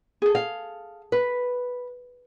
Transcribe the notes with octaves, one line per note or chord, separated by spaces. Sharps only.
G#4 A4
F5
B4